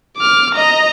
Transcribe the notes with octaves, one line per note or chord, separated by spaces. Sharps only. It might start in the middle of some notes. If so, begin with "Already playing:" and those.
D6 F6
D#5 A#5